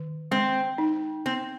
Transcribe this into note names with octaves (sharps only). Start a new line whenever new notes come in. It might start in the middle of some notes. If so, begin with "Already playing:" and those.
Already playing: D#3
G#3 C4
D#4
B3 C4